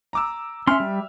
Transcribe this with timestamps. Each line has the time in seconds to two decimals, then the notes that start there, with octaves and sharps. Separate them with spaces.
0.13 A#5 D6 E6
0.67 C#4 E5 C6 F6
0.80 G3